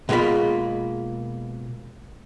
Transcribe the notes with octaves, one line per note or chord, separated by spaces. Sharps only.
B2 G#3 A#3 F4 B5